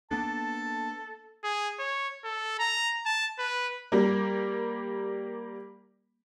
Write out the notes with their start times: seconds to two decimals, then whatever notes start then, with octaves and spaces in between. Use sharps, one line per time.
0.11 A#3 B3 D4 A4 A5
1.44 G#4
1.79 C#5
2.24 A4
2.59 A#5
3.06 A5
3.39 B4
3.92 G3 A#3